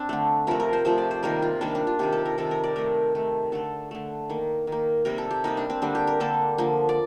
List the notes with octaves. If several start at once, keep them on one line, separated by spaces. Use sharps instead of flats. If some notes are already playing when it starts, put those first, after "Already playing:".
Already playing: C4 D4
D3 A3
C3 F3 A3 A#4
A#4
C5
C3 F3 A3 C5
D5
C5
C3 D#3 G3 A#3 A#4
F4
C3 D#3 G3 A#3 D4
D4
F4
C3 D#3 G3 G4
A4
A#4
C3 D#3 G3 A4
A#4
D5
D#3 A3 A#4
D#3 A3
D3 A3 A4
D3 A3
D#3 A#3
D#3 A#3
C3 G3 A#3 A#4
A4
G4
C3 G3 A#3 D#4
D4
C4
D3 G3 A#3 D4
G4
A#4
D3 G3 A#3 A4
D3 F3 A#3
D5